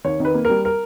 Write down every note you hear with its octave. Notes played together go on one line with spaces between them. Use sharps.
D#2 C#5
D#3 B4
A#3
A#4
G3
A#4